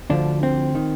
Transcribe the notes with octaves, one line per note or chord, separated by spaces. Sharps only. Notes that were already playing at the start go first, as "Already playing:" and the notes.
D2 D3 F3 D4
C4
D#3